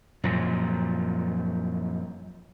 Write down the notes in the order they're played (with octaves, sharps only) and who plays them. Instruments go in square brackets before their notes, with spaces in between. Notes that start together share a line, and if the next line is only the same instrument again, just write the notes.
[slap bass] F#2 A#2 F3